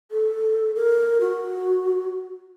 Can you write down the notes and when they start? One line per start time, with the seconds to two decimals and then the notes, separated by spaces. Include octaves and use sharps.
0.11 A4
0.76 A#4
1.21 F#4